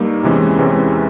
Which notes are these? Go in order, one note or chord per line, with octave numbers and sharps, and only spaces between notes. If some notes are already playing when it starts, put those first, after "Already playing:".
Already playing: G2 G3 A#3 D#4
E2 C3 E3 G#3 C#4
E2 C3 E3 G#3 C#4